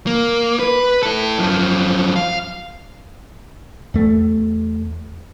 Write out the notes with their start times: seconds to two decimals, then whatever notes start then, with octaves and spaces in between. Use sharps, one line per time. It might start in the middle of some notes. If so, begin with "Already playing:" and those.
0.07 A#3
0.59 B4
1.03 E4 A4
1.39 F#2 F3
2.16 F5
3.94 E2 A3